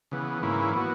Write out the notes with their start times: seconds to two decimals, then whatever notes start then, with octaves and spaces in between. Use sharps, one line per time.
0.11 C#3 E3 B3
0.43 G#2 E3 A#3 C#4 E4
0.74 E3 B3 F#4